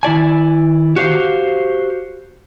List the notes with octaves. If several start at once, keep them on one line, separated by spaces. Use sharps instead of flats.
D#3 E4 D5 G#5
F#4 G4 C5 F5